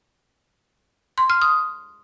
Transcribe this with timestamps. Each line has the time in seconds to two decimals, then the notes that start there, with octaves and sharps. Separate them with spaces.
1.18 C6
1.30 F6
1.42 D#6